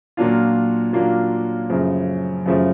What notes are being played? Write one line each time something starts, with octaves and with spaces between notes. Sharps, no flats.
A#2 F#3 A#3 D4 F4
A#2 F#3 A#3 D4 F4
F#2 C#3 F3 A3
F#2 C#3 F3 A3